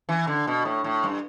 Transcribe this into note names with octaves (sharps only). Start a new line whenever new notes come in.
E3
D3
B2
A2
A2
G2